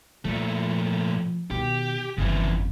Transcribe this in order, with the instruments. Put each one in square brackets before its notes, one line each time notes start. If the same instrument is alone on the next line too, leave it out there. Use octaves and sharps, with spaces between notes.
[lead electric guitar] A#2 A3 [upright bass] F3
[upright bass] B2 D#3 [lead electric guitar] G4
[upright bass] G1 F2 [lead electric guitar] C#3 E3